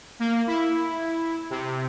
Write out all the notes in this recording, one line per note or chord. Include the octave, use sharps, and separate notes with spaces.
A#3
E4
C3